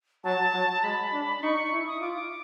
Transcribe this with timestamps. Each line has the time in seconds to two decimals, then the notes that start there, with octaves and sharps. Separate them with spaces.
0.24 F#3 A5
0.54 F#3
0.84 G#3 B5
1.13 D4
1.43 D#4 C#6
1.72 E4
1.87 D#6
2.01 F4 D6